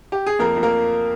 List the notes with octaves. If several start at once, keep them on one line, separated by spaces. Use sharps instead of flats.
G4
G#4
F2 A#3 A#4
F2
A#3 A#4